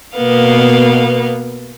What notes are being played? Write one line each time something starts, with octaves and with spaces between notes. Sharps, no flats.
B2 A#3 B3 F5